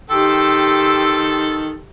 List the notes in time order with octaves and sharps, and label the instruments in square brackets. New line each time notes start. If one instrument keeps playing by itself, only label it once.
[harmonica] D#3 A4 [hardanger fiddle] G4 C6 [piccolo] E6